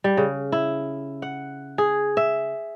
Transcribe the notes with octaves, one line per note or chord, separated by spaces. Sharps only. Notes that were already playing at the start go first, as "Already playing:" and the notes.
G3
C#3
E4
F#5
G#4
E5